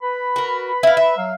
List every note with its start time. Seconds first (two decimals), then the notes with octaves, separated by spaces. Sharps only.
0.02 B4 B5
0.36 F#4 A#4
0.83 E4 F5
0.97 E5
1.17 F#3 F5